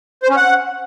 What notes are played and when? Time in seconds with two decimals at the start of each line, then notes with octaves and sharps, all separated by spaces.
0.23 C5
0.30 C#4
0.37 F#5